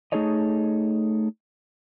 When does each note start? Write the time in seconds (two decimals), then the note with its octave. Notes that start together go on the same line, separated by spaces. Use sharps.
0.12 A3 D#4 G#4 A4 C#5 D#5